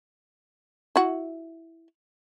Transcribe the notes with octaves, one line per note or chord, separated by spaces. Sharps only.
E4 F#4